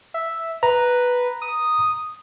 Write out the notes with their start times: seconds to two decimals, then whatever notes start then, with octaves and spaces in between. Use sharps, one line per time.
0.14 E5
0.63 B4 A#5
1.42 D#6